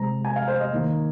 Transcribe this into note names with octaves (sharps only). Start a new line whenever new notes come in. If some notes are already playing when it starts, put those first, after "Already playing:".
Already playing: C3 G#3 A#5
G#5
F5
C5
D#5
D#3 A#3